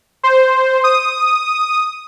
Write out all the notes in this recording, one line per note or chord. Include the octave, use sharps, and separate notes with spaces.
C5
D#6